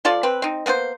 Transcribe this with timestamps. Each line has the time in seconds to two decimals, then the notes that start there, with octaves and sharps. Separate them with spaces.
0.05 F3 F4 A4 D5
0.23 C4 B4
0.42 C4 D#4
0.66 A#3 B3 G#4 C5